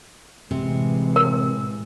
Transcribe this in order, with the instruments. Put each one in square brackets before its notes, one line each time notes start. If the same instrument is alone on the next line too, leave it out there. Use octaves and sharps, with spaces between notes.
[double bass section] A1 E3 G#3 [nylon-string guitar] C3
[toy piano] A#4